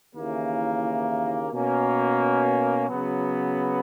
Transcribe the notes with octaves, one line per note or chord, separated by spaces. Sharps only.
D#2 C#3 E3 A#3 E4
B2 A#3 C#4
C#3 F#3 B3